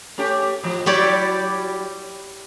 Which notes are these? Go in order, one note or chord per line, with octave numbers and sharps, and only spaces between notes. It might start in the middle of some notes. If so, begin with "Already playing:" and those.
A3 C#4 G4
G#2 F3
F#3 G3 E4 G4 C#5 D5